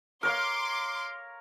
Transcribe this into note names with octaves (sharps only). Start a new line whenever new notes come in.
A#4 C#5 F5 C6 D6